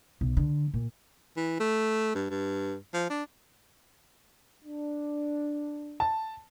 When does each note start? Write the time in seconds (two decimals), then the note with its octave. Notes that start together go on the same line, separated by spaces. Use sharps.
0.21 B1
0.37 D3
0.74 A#2
1.37 E3
1.60 A3
2.15 G2
2.30 G2
2.94 F3
3.10 D4
4.64 D4
6.00 A5